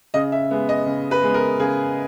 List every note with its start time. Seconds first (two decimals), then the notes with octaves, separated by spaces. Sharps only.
0.14 C#3 D#5
0.32 E5
0.51 G#3 B3
0.69 D#5
0.86 C#3
1.11 B4
1.23 G#3 B3
1.34 A#4
1.60 C#3 G#4